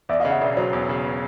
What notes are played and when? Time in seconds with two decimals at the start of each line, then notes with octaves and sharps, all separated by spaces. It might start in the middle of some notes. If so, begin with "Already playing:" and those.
0.09 E2 D5 E5
0.20 C#3 D#5 F5
0.30 E5 F#5
0.41 E1 D5 E5
0.57 F#3 C5
0.73 E2
0.89 C#3